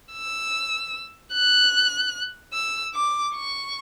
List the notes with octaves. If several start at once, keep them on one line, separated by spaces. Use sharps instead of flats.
E6
F#6
E6
D6
C#6